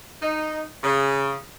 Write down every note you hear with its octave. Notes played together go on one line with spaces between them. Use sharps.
D#4
C#3